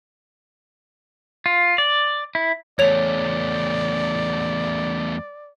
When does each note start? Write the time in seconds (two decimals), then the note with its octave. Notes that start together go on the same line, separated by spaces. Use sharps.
1.46 F4
1.78 D5
2.35 E4
2.79 E2 A3 C#5 D5 F7